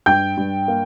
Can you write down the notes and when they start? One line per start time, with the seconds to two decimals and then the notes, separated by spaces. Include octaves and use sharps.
0.06 G2 G5 G6
0.37 G2
0.68 A#3